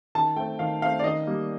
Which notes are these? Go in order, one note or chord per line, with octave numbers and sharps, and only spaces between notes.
D#3 A5
A3 C4 G5
D#3 F5
A3 C4 F5
D5
D#3 D#5
G3 A#3